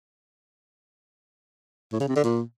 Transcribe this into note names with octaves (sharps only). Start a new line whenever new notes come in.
A2
C#3
C3
D3
A#2